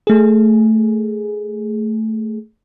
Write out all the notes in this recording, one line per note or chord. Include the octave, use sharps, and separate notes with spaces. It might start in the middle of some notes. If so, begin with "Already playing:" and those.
A3 G#4